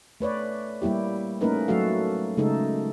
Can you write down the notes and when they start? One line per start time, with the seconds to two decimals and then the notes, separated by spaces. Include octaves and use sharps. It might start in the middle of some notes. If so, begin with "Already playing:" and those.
0.20 A3 B4 C#5 D5
0.82 G3 A#3 E4 G4
1.41 A3 A#3 C#4 D#4 A#4 B4
1.68 F#3 A3 F#4 A4 F5
2.37 C#3 G#3 A3 D#4 A4